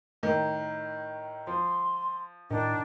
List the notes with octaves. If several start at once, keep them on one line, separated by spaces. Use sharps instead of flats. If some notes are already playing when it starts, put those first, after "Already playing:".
A2 D#3
F3 C6
A2 D#3 D4